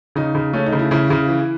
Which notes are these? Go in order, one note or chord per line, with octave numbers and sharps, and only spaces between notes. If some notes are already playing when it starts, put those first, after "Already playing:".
C#3 D#4
C#3
A3 C#4
D#4
C#3
E4
C#3 E4
C#3
E3